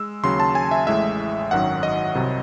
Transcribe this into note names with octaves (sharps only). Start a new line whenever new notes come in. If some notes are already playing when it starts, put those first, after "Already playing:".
Already playing: G#3 E6
D#2 C#3 F#3 C6
A5
G#5
E5
A1 A2 G#3 E5
G#1 F#2 D#3 F#3 F#5
D#5
C2 C3 F#3